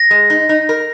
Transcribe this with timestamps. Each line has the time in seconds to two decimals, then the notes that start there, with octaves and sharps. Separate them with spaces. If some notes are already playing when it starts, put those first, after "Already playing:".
Already playing: A#6
0.11 G#3
0.30 D#4
0.49 D#4
0.69 A#4